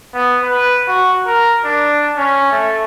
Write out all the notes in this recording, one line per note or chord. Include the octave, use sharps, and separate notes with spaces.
B3
B4
F#4
A#4
D4
C#4
A3